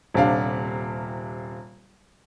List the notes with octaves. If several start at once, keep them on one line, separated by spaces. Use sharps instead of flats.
D#1 C3 D4 F5